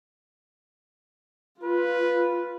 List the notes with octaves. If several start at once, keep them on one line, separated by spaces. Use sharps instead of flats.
F4 B4